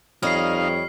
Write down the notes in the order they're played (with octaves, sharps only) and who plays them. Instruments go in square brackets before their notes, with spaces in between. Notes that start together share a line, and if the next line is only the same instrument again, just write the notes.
[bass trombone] F2 [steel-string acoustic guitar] G3 C#5 D#5 [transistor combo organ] D#4 F5 [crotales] F6 C7